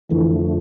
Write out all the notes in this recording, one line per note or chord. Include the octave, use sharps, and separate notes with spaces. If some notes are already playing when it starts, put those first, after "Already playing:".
F2 D3 E3 F3 A3